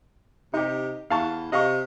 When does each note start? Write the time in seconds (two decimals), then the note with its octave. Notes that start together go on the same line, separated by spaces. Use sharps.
0.54 C3 D#4 G4
1.10 E2 F5 A5 C#6
1.52 C3 D#5 F5 C#6